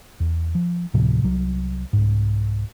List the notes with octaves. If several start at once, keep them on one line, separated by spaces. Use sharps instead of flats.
E2
F3
D2 A2 C3 F3
C2 F#3
C2 G#2